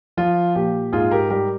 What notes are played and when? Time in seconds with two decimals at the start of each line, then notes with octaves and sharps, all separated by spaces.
0.17 F3 F4
0.55 A#2 G4
0.92 G#2 F4 G#4
1.11 G4 A#4
1.30 G3 G4 A#4